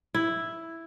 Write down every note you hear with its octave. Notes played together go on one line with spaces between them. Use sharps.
E4